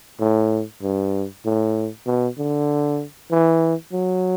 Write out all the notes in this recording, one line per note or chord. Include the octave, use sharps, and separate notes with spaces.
A2
G2
A2
B2
D3
E3
F#3